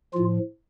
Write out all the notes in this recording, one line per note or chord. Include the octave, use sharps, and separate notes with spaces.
A2 F3 F4